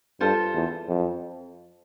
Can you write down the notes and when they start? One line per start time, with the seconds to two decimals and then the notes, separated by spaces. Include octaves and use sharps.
0.21 G2 F4 A4 C5
0.54 E2
0.88 F2